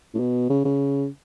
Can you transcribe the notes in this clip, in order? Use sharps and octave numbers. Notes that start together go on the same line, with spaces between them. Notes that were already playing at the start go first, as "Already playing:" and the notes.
A2
B2
C#3
C#3